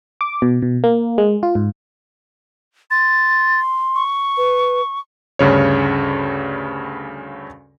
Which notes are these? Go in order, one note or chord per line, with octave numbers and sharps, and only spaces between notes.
D6
B2
B2
A#3
G#3
F4
G#2
C6 A6
C#6
B4
D2 G2 C#3 C#5